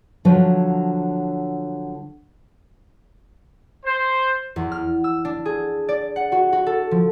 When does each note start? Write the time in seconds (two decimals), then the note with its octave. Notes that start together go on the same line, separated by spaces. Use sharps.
0.25 D3 F3 F#3
3.85 C5
4.56 E2
4.72 F6
5.04 E6
5.25 D4
5.45 G#4
5.89 D5
6.16 F#5
6.32 F#4
6.52 F#4
6.66 A4
6.91 F3